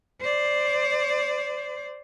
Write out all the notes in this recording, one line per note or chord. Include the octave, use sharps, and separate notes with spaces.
C5 D5